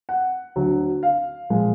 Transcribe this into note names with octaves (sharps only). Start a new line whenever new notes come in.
F#5
D2 D3 F#3
F5
A#2 F3 G#3